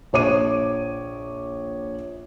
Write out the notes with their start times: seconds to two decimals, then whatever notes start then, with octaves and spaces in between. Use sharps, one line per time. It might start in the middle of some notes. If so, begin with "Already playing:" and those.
0.13 A#1 C#5 D6 D#7